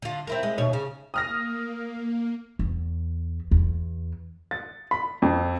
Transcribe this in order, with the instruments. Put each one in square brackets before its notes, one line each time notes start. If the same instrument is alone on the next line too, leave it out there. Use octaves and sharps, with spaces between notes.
[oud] D3 F4
C4 E4 A#4
G#3
D#2 B2 C#5
C#3
[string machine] A#3 [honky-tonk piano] D#6 F6 A#6
[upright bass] E2
E2
[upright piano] A6
B5
F2